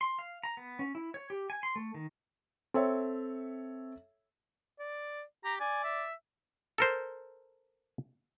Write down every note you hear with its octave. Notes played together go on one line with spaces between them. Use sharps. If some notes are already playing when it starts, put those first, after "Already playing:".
C6
F5
A#5
B3
C#4
E4
C#5
G4
G#5
C6
A3
D#3
C4 A4 C#5 E5
D5
G4 A#5
D5 G#5
E5
A4 A#4 C5